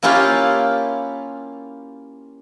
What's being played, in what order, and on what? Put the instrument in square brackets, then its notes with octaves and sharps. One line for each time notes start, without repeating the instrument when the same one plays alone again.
[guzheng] A#3 C#4 E4 F4 G4 F5